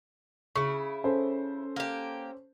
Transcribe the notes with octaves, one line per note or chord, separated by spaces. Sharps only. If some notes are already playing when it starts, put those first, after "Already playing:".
C#3 E4 C#6
C#4 A4 C5
A#3 G4